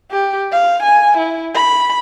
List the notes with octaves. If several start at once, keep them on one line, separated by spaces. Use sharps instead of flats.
G4
F5
G#5
E4
B5